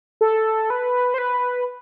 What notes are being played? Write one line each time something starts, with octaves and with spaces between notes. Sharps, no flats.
A4
B4
C5
B4